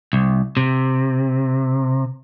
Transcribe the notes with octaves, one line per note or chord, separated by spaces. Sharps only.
C2
C3